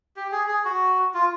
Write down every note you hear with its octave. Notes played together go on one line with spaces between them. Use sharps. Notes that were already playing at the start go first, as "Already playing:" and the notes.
G4
G#4
G#4
F#4
F4